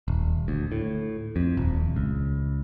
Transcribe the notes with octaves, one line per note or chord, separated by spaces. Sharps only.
D#1
D2
A2
F2
D#1
C#2